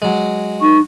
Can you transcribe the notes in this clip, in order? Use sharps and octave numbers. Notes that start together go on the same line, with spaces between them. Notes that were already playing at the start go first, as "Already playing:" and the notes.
F#3 G#3
D#4 C#6